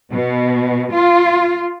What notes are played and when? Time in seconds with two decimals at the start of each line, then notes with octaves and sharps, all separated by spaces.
0.12 B2
0.93 F4